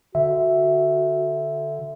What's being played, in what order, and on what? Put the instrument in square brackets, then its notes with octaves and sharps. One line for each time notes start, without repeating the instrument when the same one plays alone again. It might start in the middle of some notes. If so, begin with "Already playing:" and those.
[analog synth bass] D3 [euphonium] F#4 [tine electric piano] E5